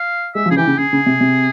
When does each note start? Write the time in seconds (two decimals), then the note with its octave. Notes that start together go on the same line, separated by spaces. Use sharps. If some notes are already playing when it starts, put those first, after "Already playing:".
Already playing: F5
0.35 G#3 E5
0.46 F3
0.51 C#3 G#4
0.57 E3 G4
0.67 C#3
0.78 C#3 G#4
0.93 C#3
1.06 C3
1.21 C3